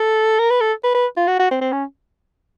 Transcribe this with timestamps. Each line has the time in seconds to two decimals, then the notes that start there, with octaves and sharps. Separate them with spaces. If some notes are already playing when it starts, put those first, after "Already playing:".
Already playing: A4
0.39 A#4
0.50 B4
0.61 A4
0.84 B4
0.95 B4
1.17 F4
1.27 F#4
1.39 F#4
1.51 C4
1.61 C4
1.72 C#4